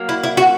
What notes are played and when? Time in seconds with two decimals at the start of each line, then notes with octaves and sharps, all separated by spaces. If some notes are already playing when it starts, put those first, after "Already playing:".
Already playing: F#3 A#3
0.09 E4
0.23 E4
0.37 F#4